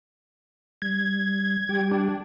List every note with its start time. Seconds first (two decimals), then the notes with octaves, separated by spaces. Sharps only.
0.82 G3 G#6
1.69 G3 G4 G5
1.91 D4